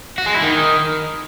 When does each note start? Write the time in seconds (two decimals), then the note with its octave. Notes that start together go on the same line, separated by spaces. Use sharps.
0.18 F#4
0.26 G#3
0.34 E4
0.42 D#3